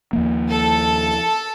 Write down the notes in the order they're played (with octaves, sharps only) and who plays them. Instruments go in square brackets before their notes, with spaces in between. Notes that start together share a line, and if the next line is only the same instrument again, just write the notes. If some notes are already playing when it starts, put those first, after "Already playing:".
[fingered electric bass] D#2 F3 A#3
[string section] A4